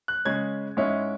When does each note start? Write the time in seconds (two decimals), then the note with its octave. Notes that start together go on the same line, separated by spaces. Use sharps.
0.08 F#6
0.25 C#3 G#3 C#4 G#6
0.77 G#2 G#3 C#4 E4